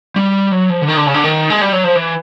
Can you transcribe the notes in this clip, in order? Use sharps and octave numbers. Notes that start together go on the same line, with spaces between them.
G3
F#3
F3
D3
D#3
D3
C#3
D3
D#3
G#3
G3
F#3
F3
E3